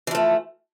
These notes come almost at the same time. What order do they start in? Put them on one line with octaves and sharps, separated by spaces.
E3 F3 A3